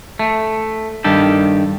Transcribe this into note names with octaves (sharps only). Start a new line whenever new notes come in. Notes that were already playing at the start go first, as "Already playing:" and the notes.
A3
G2 D#3 G4 A4